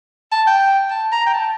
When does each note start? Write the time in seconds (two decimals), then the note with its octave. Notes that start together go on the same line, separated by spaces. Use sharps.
0.32 A5
0.47 G5
0.90 A5
1.12 A#5
1.26 G5
1.34 A5